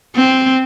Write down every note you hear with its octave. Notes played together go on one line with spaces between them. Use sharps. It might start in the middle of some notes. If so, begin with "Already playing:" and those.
C4